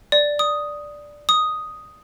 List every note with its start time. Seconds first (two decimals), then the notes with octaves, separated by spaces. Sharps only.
0.12 D5
0.39 D#6
1.29 D#6